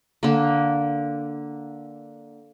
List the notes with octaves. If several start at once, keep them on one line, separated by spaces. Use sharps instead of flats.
D3 A#3